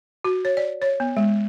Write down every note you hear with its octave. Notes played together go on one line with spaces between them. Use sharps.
F#4
C#5
D5
C#5
B3
G#3